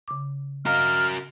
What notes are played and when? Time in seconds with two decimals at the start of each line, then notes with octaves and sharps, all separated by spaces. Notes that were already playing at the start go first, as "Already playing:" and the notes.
0.08 C#3 D6
0.66 F#4 A#4 D#5 F5 F6